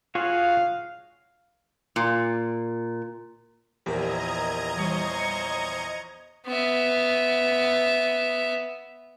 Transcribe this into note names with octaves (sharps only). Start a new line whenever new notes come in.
F4 F#4 G#4 C#5 F5
A#2
A#1 E2 G4 A#4 C5 D#5 A#5 G#6
E3 G3 C5 C#5 C#6
B3 E5